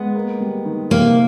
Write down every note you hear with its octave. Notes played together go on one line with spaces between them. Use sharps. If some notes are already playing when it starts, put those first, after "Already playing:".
Already playing: G#3 B3
A#3
G3
D#3
C3 A#3